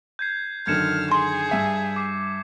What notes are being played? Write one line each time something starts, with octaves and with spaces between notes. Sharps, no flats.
G6 G#6 C7
F#2 D3 D#3 F6 G#6 C#7 E7
G#4 C6
G2 E5 G#5
D6 C7